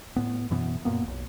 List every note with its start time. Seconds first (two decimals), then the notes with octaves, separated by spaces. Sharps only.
0.16 A2 B3
0.50 F#2 B2 E3 B3
0.85 F#2 A#2 A#3 B3
1.03 E1 B1